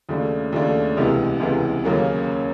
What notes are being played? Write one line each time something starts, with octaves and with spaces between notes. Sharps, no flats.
D#2 C#3 F3 A3 D4
D#2 C#3 F3 A3 D4
C#2 C3 E3 G#3 B3
C#2 C3 E3 G#3 B3
D#2 C#3 F#3 A#3 C#4